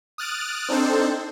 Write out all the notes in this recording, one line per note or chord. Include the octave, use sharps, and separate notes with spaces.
D#6 F6 F#6 A6 D7
C4 D4 D#4 A4 C5